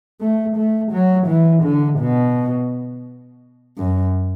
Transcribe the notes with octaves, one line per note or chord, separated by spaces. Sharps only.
A3
A3
F#3
E3
D3
B2
F#2